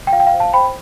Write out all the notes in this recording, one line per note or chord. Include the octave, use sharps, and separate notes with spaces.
G5
F4 F5
G5
F5
C5
F5 A5
C5 G5 B5